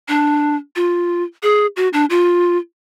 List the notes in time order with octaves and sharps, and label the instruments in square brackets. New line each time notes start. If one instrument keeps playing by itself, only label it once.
[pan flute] D4
F4
G#4
F#4
D4
F4